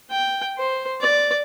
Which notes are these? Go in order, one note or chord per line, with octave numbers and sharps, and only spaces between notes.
G5
C5
D5